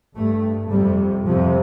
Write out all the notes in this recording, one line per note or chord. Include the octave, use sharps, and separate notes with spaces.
G2 A3
F2 C3 G3
F2 C3 F3